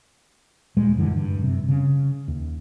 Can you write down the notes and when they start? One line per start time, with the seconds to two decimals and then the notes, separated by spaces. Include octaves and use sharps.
0.77 D#2 A#2 G3 G#3
0.96 A1 F#2 D3 E3
1.12 G2
1.38 F#2 C3
1.68 C#3
2.28 D#2